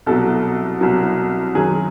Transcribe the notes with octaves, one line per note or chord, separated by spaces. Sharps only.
C2 B2 F#3 A4
C2 B2 F#3
F#2 D#3 F#3 G#4